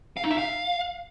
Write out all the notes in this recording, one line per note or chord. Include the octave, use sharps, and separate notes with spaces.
F5
D#4
E5
F5